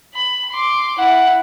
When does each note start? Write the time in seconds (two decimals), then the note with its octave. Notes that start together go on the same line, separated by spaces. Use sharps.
0.15 B5
0.52 C6 D6
0.99 E4 F#5